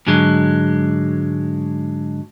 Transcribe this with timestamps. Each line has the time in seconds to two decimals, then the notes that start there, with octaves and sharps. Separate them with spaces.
0.07 G#2 D3 F#3 G#3